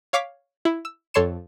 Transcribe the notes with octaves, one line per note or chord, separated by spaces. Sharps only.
C#5 F5 C#6 D6 F6 B6
E4
E6
F2 A4 C#5 C6 C#7 E7